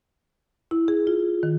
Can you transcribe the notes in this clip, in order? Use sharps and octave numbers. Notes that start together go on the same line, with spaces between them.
E4
G#4
F4
D#3